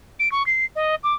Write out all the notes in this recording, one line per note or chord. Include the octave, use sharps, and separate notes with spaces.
D7
C#6
C7
D#5
D6